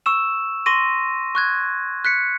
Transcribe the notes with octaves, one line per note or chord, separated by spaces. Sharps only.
C#6 E6 E7
C6 C#6 A#6 D#7
C#6 F#6 G#6
F#6 B6 C#7